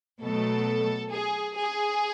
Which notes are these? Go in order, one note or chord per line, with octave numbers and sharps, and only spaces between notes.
B2 F#3 A3 A4
G#4
G#4